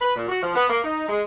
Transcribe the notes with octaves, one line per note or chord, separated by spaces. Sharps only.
B4
A#2
F#4
F3
B3
A#3
D#4
G#3